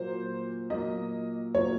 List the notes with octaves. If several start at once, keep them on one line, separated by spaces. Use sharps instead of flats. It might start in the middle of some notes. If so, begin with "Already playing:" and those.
Already playing: A#2 F#3 A#3 C5
A#2 F#3 A#3 D#5
A#2 F#3 A#3 C#5